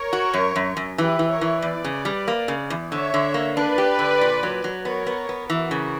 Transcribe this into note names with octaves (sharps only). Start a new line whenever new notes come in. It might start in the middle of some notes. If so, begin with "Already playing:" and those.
Already playing: A#4 C#5
F#4
F#2
F#2
F#2
E3 G4 B4
E3
A#4 C#5
E3
E2 B4 D5
C#3
G3
A#3
C#3
E2
D3 C#5 E5
D3
A#3
D4 B4 D5
G4
D3
A#2
F#3
F#3
B3 A#4 C#5
B3
B3
E3 F#4 A#4
C#3